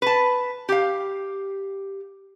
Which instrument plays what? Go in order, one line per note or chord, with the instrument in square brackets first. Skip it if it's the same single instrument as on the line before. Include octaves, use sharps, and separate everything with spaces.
[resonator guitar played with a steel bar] B4 A5
G4 F5